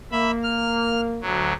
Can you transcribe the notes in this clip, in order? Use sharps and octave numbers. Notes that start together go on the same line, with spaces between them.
A#3 E5 B5
F6
D2 F#3